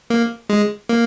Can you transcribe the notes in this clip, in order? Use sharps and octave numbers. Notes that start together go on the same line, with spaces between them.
A#3
G#3
A#3